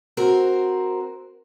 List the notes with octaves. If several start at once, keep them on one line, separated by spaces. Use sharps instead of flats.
C4 F#4 A#4 C5